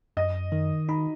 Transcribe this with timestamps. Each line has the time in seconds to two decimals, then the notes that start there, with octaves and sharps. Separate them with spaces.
0.17 F#2 D#5
0.52 D#3
0.89 D#4 B5